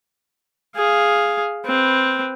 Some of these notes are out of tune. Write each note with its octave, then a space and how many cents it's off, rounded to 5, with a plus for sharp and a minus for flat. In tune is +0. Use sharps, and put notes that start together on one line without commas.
G#4 +0 F5 +0
C4 +0 B4 +0